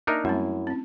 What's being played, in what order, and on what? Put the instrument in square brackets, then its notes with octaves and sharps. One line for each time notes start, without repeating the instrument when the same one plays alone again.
[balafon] A#3 E5 [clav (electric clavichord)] D4 D#4 A#4
[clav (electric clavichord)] F#2 [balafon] G3 A3 C4 [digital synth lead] E4
[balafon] C4 C#4